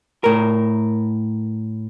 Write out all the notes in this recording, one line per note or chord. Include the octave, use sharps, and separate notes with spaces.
A2 A#4